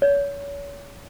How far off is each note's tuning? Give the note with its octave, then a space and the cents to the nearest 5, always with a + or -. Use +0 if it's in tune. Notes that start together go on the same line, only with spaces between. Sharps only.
C#5 +35